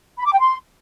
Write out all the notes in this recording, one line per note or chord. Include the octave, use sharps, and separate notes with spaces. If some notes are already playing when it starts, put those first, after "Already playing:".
B5
D6
G5
C6